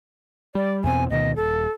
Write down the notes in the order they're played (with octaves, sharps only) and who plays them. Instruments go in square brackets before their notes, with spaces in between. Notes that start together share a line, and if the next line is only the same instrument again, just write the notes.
[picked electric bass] G3 [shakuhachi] D5
[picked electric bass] E2 B2 C4 [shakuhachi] G#5
[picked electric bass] D2 B2 D#3 [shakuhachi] D#5
[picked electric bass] D#1 [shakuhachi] A4